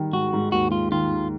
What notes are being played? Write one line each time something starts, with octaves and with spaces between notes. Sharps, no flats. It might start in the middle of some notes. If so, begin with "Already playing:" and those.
Already playing: D#3 G3
G#2 F#4
G#2
D#2 F#4
G#3 F4
D#3 F4
D#2